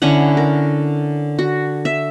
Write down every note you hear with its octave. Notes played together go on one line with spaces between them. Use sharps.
D3 C#4 E4 F#5
A#4
F#4
E5